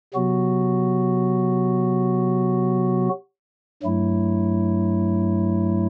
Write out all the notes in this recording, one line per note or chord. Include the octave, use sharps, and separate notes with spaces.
C3 F#3 B3 F#4
G2 F#3 A3 E4